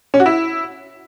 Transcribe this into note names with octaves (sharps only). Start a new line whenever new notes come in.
C#4
F#4
E4